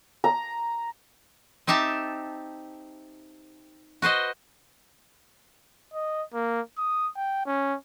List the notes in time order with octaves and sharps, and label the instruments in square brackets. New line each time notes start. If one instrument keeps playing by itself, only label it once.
[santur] A#5
[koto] C4 D#4 G4 E5 A5
F#4 B4 C5 D#5
[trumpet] D#5
A#3
D#6
G5
C#4